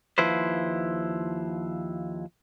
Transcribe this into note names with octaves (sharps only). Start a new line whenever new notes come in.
D#2 F3 E4 B4 C5